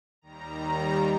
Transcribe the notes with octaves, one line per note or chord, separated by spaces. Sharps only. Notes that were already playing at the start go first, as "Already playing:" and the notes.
D#2 D#3 G3 A#5